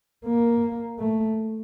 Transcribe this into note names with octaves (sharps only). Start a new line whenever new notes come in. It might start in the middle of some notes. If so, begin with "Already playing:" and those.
A#3
A3